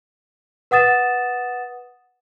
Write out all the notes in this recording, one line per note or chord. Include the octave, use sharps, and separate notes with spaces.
B4 F#5 D#6 A6 E7